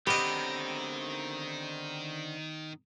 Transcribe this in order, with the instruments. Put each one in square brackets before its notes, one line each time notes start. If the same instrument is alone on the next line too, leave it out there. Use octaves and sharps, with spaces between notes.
[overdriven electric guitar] D3 C4 [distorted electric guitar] D#3 [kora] B3 F5 [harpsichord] G4 D#5